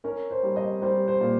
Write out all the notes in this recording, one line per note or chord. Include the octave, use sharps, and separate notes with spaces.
C#4 A#4
C5
G3
D#5
G3 C5
C5
A#2